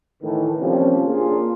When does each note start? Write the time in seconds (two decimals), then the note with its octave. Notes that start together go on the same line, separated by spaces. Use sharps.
0.22 A2 D#3 E3
0.60 C3 F3 G3 A#3 C4 C#4
1.07 A#3 D4 F4 G#4